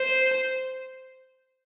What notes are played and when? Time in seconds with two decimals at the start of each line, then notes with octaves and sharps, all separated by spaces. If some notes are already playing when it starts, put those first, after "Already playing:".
Already playing: C5